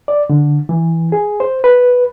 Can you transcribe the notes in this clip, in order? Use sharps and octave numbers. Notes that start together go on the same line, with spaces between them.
D5
D3
E3
G#4
C5
B4